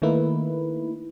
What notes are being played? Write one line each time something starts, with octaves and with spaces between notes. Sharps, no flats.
D#3 A3 A#3 D#4 E4 B4